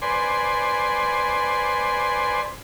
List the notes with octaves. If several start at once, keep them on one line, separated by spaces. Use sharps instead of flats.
B4 C5 D5 G#5 C6